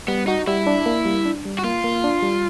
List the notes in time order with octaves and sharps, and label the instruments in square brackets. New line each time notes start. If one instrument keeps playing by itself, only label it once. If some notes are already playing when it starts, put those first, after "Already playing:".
[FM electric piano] G3 [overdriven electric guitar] B3
[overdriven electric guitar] D#4 [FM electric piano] F#4
[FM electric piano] G3 [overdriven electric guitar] E4
[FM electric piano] D4
A#3
G3
D4
G3
[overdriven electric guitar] F#4
[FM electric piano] A#3 [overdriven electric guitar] F4
[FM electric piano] A#3
D4
G3